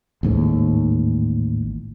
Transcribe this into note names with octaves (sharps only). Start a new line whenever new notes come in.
A1 D#2 G#2